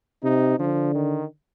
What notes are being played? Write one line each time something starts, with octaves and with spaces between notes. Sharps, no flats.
C3 D#4
D3 F3
D#3